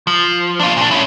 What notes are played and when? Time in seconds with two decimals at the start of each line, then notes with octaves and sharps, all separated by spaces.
0.07 F3
0.60 D4 F4
0.77 A#2 D4
0.91 C#4 E4